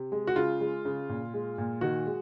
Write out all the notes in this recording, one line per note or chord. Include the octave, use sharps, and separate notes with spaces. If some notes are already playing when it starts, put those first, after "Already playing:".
Already playing: C3
G#3
F#4
C#3 F4
G#3
C#3
A#2
G#3
A#2
D#3 F#4
G#3